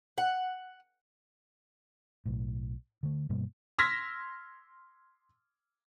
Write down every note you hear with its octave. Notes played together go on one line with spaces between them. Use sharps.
F#5
B1 A2
D3 A3
G2 B2 G3 A#3
C6 E6 F6 G#6 A#6 B6